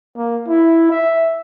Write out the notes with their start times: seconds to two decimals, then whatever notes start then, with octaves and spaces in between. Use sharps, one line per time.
0.16 A#3
0.48 E4
0.91 E5